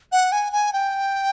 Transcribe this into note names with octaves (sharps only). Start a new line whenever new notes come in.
F#5
G#5
G#5
G5